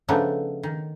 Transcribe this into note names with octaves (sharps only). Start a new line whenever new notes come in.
C#3 F3 A3 B3 D4 D#4
D#3